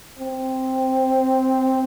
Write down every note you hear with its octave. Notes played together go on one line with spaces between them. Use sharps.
C4